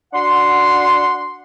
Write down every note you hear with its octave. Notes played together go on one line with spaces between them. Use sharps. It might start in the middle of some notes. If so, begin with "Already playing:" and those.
D4 F#4 F#5 C6